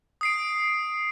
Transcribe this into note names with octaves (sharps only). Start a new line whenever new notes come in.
D#6 C7 D7